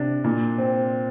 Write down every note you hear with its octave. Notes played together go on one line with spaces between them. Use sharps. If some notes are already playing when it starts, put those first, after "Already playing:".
Already playing: C3 D4
A#2
C4